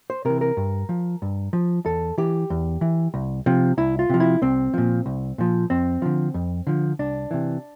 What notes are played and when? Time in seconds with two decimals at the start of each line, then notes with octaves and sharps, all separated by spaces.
0.10 C5
0.25 C3 E3 A#4
0.41 A#4
0.57 G2
0.89 F3
1.22 G2
1.53 F3
1.85 E2 A4
2.18 E3 G4
2.50 E2
2.81 E3
3.14 C2
3.46 C3 F3
3.77 C2 E4
3.99 F4
4.10 C3 F3
4.20 E4
4.42 C2 C4
4.74 A#2 F3
5.06 C2
5.38 A#2 F3
5.70 F2 C4
6.02 D3 F3
6.34 F2
6.67 D3 F3
6.99 C2 D4
7.31 C3 E3